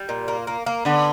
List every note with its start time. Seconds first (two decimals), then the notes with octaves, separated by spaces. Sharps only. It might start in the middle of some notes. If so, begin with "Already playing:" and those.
Already playing: G3
0.09 A#2
0.28 A#3
0.47 A#3
0.66 A#3
0.85 D3 B3